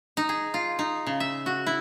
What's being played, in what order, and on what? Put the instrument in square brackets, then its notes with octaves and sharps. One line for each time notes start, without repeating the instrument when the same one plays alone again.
[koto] D#4
G#4
F4
D#4
C#3
E5
F#4
E4